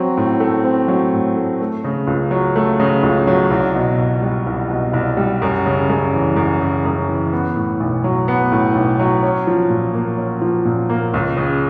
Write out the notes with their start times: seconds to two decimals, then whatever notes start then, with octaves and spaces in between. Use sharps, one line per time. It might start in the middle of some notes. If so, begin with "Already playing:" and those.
Already playing: F#3 C4
0.17 A2
0.40 A3
0.64 C4
0.88 F#3
1.13 A2
1.36 A3
1.61 A3
1.84 C#3
2.07 C#2
2.31 F#3
2.56 A3
2.80 C#3
3.03 C#2
3.27 F#3
3.51 C2
3.75 B2
3.99 C2
4.22 G3
4.46 C2
4.70 B2
4.93 C2
5.17 G3
5.42 F#2
5.66 C#3
5.89 F#2
6.13 E3
6.36 F#2
6.61 C#3
6.85 F#2
7.08 E3
7.33 B3
7.56 A2
7.80 B1
8.04 F#3
8.28 B3
8.52 A2
8.75 B1
9.00 F#3
9.23 C#4
9.47 F3
9.70 A#2
9.94 A#3
10.18 C#4
10.41 F3
10.65 A#2
10.89 A#3
11.14 C#2
11.37 C#3